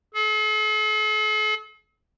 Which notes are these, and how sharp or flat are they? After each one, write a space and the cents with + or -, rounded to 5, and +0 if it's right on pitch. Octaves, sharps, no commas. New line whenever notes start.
A4 -45